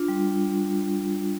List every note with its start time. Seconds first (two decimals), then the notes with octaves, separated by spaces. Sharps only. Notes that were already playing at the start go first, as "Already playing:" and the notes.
Already playing: D4 F4
0.08 G3